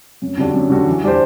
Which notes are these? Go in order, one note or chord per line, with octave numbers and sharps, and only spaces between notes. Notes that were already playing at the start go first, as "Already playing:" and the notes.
F#2
D3 G3 D4 F#4
F#2
D3 G3 D4 F#4
E3
G3 D4 G4 C5